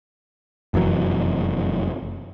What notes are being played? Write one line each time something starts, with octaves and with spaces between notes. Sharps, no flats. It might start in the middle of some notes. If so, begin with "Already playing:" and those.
F1 F#2 E3 F#3